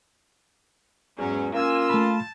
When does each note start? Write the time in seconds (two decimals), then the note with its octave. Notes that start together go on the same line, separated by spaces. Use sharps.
1.18 E2 G#2 F#3 C#4
1.54 A#3 C#4 F4 G#5 E6
1.90 A3 A5 B5